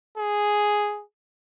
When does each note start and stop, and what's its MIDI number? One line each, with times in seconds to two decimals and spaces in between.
0.18 1.02 68